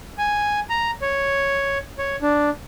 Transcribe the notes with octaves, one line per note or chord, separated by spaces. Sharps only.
G#5
A#5
C#5
C#5
D4